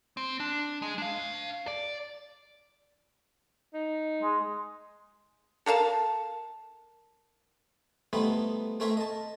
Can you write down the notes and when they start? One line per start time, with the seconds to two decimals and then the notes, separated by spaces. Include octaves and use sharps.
0.17 C4
0.40 D4
0.82 G#3
0.98 D4 F5
1.67 D5
3.74 D#4
4.23 G#3
5.66 A4 A#4 F5 A5
8.13 G3 A3 B3 C4 D#4 E4
8.80 A3 C4 A#4 C#5 E5 G5
8.97 D#5 A5